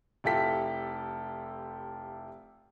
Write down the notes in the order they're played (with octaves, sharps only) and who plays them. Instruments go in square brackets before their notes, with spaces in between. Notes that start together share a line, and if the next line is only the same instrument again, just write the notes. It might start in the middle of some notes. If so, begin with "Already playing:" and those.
[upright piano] F1 E4 F4 G4 A4 B6